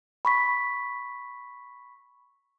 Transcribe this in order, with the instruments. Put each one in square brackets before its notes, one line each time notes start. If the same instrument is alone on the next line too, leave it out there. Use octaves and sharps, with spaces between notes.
[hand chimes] B5 C#6 B6